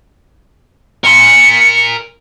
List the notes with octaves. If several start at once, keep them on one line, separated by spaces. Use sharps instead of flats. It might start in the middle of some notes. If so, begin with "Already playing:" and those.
A#4 C6 C#7